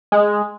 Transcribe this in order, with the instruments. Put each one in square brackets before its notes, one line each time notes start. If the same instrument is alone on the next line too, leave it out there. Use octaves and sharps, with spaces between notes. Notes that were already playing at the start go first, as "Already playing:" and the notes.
[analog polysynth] G#3